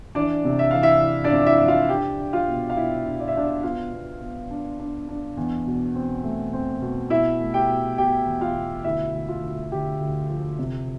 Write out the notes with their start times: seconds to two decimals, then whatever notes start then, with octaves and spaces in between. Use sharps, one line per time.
0.15 E3 D4 D5
0.45 C3
0.59 E5
0.71 E3 F5
0.83 E4 E5
1.02 E3
1.24 D4 D5
1.32 F2
1.47 E4 E5
1.58 F2 E5
1.68 F4 F5
1.89 D4 G4 G5
2.19 D4
2.33 F4 F5
2.47 B2
2.70 F5
2.76 B2 E4 E5
3.05 D4
3.20 D5
3.28 E5
3.34 B2 D4 D5
3.63 B3 F4 F5
3.92 B3
4.21 B3
4.51 D4
4.79 D4
5.09 D4
5.37 E2
5.66 B2
5.95 C4
6.24 A3
6.53 C4
6.81 B2
7.10 B2 E4 E5
7.40 A3
7.54 G4 G5
7.68 B2
7.98 B2 G4 G5
8.26 E2
8.41 F4 F5
8.55 B2
8.84 D2 E4 E5
9.14 D2
9.29 F4
9.42 D2
9.72 D3 G4
10.00 D2
10.30 F3
10.59 C3